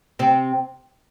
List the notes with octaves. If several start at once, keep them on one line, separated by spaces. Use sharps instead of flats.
C3 C4